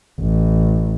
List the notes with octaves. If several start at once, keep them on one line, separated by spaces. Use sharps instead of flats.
A1